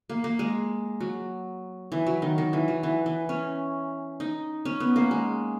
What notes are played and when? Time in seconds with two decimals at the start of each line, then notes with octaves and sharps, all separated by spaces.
0.09 A#3
0.24 A#3
0.39 G#3
1.01 F#3
1.92 E3
2.07 F#3
2.22 D#3
2.38 D#3
2.53 E3
2.68 F#3
2.83 E3
3.06 E3
3.29 C#4
4.20 D#4
4.65 C#4
4.80 B3
4.96 A#3
5.11 G#3